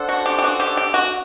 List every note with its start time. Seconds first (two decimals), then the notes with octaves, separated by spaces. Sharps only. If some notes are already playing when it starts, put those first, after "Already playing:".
Already playing: D4 A4 C5 F#5
0.09 F#4
0.26 G4
0.38 G4
0.44 F#4
0.60 G4
0.77 G4
0.94 F#4